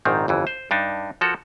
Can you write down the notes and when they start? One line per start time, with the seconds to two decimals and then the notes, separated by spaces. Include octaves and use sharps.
0.05 A#1 G#2 D#3 C4
0.28 G1 F2 E3
0.47 C5
0.71 G2 D4 D#4
1.21 F3 F#4 A4 A#4